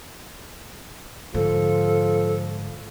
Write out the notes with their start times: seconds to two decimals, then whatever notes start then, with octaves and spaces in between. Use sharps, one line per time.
1.34 G#2 D3 F3 A4